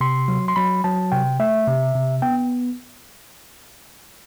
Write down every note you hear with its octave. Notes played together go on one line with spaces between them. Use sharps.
C3 C6
F#3
C6
F#3 B5
F#3 A5
C3 G5
A3 E5
C3
C3
B3 G5